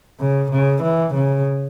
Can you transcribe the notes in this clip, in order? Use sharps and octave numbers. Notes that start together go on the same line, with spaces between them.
C#3
C#3
E3
C#3